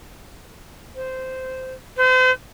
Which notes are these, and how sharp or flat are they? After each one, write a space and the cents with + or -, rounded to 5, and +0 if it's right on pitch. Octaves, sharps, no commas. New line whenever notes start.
C5 -10
C5 -40